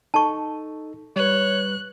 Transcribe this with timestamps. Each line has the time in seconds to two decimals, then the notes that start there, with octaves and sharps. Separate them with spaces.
0.14 D#4 A4 A5 C#6
1.16 G3 B4 C#5 F#6